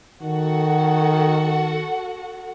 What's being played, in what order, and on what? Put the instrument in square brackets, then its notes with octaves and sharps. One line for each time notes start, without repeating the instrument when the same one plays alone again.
[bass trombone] D#3 [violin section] F#4 A4 F#5